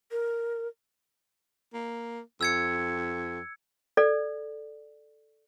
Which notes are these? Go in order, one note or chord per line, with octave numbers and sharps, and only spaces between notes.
A#4
A#3
F2 E6 G#6 C#7
A4 D5